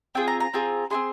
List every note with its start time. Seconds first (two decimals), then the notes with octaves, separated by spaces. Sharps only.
0.15 C4 F4 G#4 G5
0.28 A#5
0.40 A#5
0.53 C4 F4 G#4
0.90 C4 D#4 G#4 C6